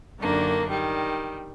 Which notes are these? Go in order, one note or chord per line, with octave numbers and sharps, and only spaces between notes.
F#2 D3 D#3 A#3 D4
D#3 G3